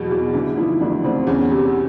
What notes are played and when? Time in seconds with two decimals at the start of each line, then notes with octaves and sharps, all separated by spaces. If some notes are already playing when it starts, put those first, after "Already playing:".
Already playing: E2 B2 F#3
0.11 E2
0.34 D3 E3 E4
0.57 E3 F3 E4
0.81 D2 D3 D4
1.04 D2 C4
1.27 E2 C#4
1.50 C3